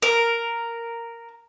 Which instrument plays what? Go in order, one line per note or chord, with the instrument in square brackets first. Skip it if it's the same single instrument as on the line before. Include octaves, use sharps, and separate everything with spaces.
[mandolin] A#4